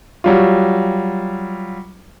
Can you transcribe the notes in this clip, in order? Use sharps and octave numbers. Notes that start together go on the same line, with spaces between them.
F#3 G3 F4